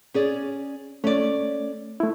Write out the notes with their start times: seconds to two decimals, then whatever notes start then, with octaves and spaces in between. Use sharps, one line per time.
0.14 C#4 G#4 D5
1.04 A3 C#4 D5
2.00 A3 E4